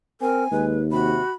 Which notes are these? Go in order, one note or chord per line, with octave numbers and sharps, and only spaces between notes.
C4 A#4 G#5
D#2 G#3 B4
C3 F#4 B5